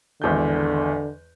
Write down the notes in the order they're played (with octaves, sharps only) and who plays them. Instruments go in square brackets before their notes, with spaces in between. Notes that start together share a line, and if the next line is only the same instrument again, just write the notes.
[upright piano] G#1 E2 G6 [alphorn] D3